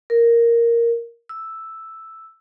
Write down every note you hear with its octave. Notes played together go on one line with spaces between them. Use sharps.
A#4
E6